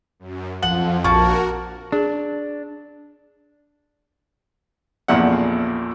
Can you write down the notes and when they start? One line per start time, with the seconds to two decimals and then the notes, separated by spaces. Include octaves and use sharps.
0.19 F#2
0.63 F2 F3 F#5 F#7
1.04 A#1 A#3 F#4 A#4 A5 C#6
1.92 D4 G#4
5.08 A1 E2 A#2 F3 E4 F#5